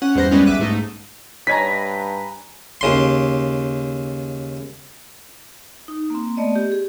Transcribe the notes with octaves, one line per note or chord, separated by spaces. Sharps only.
C#4 F#5
E2 G2 G3 C5 F#5 A#6
G3 G#3 B3 C#4
B1 E5 D6 F#6 D#7
G#2 A3 D#4
G2 D#4 B4 C#5 G#5 A#5 B6
D#2 C#3 C6
D#4
A#3 C4
A3 B3 D5 D#5
G4
G#4